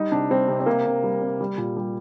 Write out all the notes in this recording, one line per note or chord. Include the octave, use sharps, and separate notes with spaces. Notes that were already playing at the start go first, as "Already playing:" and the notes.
Already playing: G3 D#4
C3 D4
G3 C4
C3
C4
C3 A#3
C3
G3
C3
G3
A#2
G3